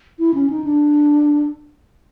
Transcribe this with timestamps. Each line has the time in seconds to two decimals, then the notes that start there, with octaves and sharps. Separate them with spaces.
0.19 E4
0.34 C#4
0.50 D#4
0.64 D4